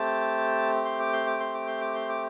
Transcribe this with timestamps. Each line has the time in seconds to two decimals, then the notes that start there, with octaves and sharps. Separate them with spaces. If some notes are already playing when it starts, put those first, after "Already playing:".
Already playing: A3 C4 G4 A5
0.85 C6
0.99 D6
1.13 C6
1.26 D6
1.40 C6
1.54 D6
1.67 C6
1.81 D6
1.95 C6
2.09 D6